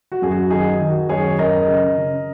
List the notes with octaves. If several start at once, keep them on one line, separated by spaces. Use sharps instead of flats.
F#4
F#2 G#4
F#4
D#3 D#4 G#4
D#3
F#4
F#2 G#4 C#5
F#2 A#4 D#5
C#3
C#3